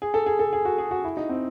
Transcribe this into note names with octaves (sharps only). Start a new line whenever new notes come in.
G#4
A4
G#4
A4
G#4
F#4
G#4
F#4
E4
D#4
C4